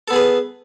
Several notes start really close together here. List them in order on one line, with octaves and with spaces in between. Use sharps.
A4 B3 G#4 B4